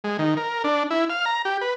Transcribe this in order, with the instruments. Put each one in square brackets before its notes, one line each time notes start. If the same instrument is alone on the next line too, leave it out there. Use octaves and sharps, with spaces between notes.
[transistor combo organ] G#3
D#3
A#4
D4
E4
F5
A#5
G4
B4